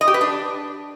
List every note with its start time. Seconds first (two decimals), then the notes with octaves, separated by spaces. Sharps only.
0.01 D#5
0.08 G4
0.14 B4
0.21 D4